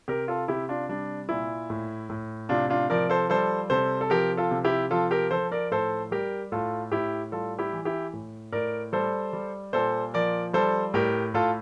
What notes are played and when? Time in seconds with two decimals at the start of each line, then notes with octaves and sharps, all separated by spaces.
0.08 C3 G4 A#4
0.28 F4 A4
0.48 C3 E4 G4
0.69 D4 F4
0.89 G3 D4
1.29 A#2 E4
1.70 A2
2.10 A2
2.49 C3 D4 F4
2.70 D4 F4
2.90 F3 A#4 D5
3.10 A4 C5
3.30 G3 A4 C5
3.70 C3 A4 C5
4.01 A4
4.10 F3 G4 A#4
4.37 F4 A4
4.51 C3
4.64 E4 G4
4.91 F3 F4 A4
5.11 G4 A#4
5.31 F3 A4 C5
5.52 A#4 D5
5.71 A2 A4 C5
6.11 G3 G4 A#4
6.52 A2 F4 A4
6.92 A2 E4 G4
7.32 G3 F4 A4
7.59 E4 G4
7.73 E3
7.85 E4 G4
8.13 A2
8.52 A2 A#4 D5
8.93 G3 A4 C5
9.33 G3
9.73 A#2 A4 C5
10.14 F3 A#4 D5
10.53 G3 A4 C5
10.94 A2 G4 A#4
11.34 A2 F4 A4